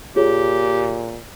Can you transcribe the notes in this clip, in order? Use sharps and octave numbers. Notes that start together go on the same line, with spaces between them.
A#2 F4 G4 G#4 C#5